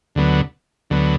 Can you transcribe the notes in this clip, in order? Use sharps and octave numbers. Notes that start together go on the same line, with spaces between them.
D2 D3 F#3 B3
D2 D3 F#3 B3